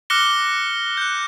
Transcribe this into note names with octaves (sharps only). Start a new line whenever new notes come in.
D6 F6 F#6 A#6 C#7 G7
F#6 G6